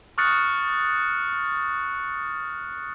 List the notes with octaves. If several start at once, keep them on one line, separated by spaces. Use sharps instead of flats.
C#6 D#6 F6 F#6 A6 C#7